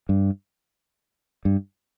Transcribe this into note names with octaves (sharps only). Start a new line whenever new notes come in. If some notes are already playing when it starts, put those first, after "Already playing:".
G2
G2